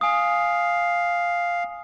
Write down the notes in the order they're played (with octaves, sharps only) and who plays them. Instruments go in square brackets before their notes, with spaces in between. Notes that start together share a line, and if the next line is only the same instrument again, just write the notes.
[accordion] F5 [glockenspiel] G#5 D#6